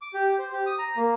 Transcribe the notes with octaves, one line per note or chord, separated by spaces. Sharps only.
D6
G4
C5
G4
D#6
A#5
A#3